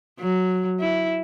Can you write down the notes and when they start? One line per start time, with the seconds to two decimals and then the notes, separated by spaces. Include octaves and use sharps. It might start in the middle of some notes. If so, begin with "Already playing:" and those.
0.19 F#3
0.80 E4